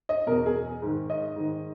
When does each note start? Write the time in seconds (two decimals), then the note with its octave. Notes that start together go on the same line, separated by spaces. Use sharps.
0.09 D#5
0.27 E2 B2 A#4
0.46 G#4
0.82 G#2 D#3
1.10 D#5
1.36 G#2 D#3